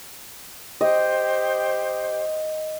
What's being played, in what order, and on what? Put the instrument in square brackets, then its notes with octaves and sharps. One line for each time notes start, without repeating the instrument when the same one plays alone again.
[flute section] G4 C5 G5 [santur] D#5